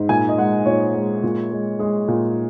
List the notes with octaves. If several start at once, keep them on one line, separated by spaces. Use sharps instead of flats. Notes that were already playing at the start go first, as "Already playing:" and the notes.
Already playing: G#2
A#2 G#5
D#5
G#3 F#5
A#2 C#5
G#3
A#2
G#3
G#3 G#4
A#2